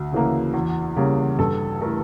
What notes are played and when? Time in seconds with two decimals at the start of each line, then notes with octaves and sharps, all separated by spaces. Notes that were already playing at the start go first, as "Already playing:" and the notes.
Already playing: D2
0.12 C#3 E3 A#3
0.54 E2
0.96 C#3 G3 A#3
1.39 G2 A4
1.81 E3 A3 A#4